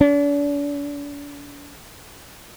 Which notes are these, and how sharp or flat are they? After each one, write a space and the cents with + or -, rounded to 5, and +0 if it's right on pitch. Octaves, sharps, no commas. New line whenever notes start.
D4 -40